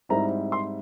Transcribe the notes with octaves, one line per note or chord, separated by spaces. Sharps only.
G#2 G3 C4 E4 A#5
C6